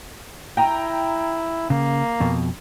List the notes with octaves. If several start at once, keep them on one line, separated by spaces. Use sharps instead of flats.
E4 G5 A#5
C#3 A#3
F2 B2